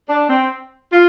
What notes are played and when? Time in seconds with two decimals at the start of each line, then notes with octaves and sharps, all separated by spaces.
0.09 D4
0.30 C4
0.93 F4